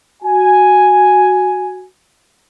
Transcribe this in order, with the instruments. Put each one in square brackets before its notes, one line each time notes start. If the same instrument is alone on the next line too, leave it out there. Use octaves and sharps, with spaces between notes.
[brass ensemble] F#4 G#5